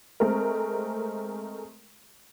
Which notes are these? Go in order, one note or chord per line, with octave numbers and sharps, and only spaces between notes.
G#3 A3 C4 A#4